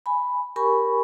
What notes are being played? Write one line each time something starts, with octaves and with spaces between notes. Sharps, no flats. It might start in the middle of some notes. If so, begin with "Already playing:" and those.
G#5 B5
G4 A#4 G#5 B5 C#6